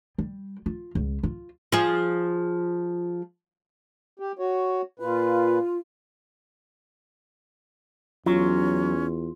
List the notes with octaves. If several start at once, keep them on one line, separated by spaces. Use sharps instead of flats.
G3
F4
C#2
F4
F3 G#4
G4
F#4 C#5
A#2 F4 B4
E2 F#3 C#4 F4